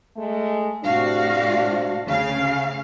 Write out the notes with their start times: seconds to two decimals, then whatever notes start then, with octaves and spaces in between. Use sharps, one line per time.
0.17 G#3 A3
0.84 A2 C3 D4 F#4 F5
2.06 D2 C#3 F5